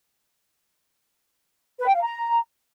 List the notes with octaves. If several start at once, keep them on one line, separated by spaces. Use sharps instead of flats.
B4
G5
F5
A#5